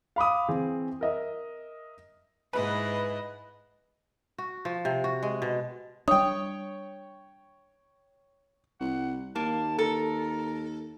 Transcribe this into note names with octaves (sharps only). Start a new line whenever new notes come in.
F5 B5 D6 D#6
E3 C4 G#4
A#4 D#5 E5
G#2 E4 B4 D#5
F#4
F3
C3
F#4
G#3
B2
G3 D4 C#5 G5 D#6
C2 F#5
D#2 A#3 A5
A4 A#4